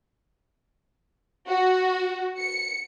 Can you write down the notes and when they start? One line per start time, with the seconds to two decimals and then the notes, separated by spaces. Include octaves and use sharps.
1.48 F#4
2.39 C#7